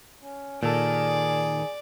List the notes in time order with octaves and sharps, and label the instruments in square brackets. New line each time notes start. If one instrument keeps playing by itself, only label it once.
[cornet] C#4
[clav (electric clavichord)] A#2 A4 [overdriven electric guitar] D#3 [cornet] G#4 [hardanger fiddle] D5